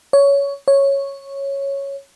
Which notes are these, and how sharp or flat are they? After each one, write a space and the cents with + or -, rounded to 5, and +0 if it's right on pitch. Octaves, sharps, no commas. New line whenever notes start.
C#5 +15
C#5 -5